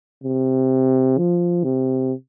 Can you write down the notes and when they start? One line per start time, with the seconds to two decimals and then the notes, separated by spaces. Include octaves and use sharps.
0.24 C3
1.18 F3
1.64 C3